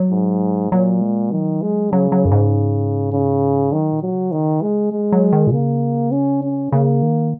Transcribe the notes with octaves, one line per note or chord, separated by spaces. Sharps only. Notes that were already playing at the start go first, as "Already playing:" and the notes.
Already playing: F#3
G#2
A#2 F#3
G#3
D#3 F#3
G#3
C#3 F#3
F#3
F#2
G#2
C#3
D#3 F#3
A#2
F#3
C#3
D#3
G#3
F#3 G#3
F#3
D#3
A#2
C#3 A#3
C#4
C#4
C#3 A#3
D#3